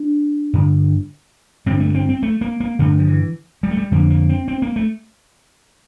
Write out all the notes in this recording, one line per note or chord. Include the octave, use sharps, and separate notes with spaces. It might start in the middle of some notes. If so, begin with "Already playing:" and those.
Already playing: D4
G2 D3
G2 D3 C4
A3
C4
C4
A3
A#3
A#3
G2 D3 A3
F3
E3
G3
A3
G3
F2 D3 A#3
A#3
C4
C4
A#3
A3